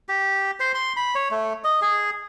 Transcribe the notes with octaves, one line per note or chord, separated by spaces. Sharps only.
G4
C5
C6
B5
C#5
A3
D#5
G#4